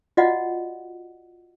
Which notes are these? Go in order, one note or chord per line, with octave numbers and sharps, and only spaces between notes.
F4 F#4 D5 D#5 F5 F#5